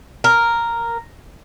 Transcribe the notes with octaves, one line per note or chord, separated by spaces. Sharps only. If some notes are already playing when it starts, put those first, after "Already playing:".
A#4